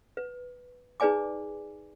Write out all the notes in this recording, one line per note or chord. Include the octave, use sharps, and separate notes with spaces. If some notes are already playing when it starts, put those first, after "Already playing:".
B4
D#4 G#4 B4 D5 G#5 D6